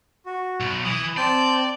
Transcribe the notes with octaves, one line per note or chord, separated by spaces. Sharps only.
F#4
B1
E3 D#6
C4 D5 A5 G6